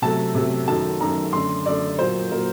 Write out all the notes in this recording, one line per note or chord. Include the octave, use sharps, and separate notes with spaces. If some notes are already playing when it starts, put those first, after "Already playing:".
C3 F#3 A3 A5
C3 F#3 A3
F#2 D#3 F#3 A3 A5
F#2 D#3 F#3 A3 A#5
F#2 D3 A3 C6
F#2 D3 A3 D5
A#2 F#3 A#3 C5
A#2 F#3 A#3 A#4